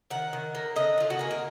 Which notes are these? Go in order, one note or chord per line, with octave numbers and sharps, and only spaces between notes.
D#3 F#5
D#3
A#3
D3 D#5
D3 F4
F#4
A#3 G#4
A#4